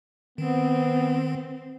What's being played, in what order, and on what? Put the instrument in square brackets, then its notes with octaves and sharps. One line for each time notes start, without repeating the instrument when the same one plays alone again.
[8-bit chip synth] D#3 [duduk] B3 [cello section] C4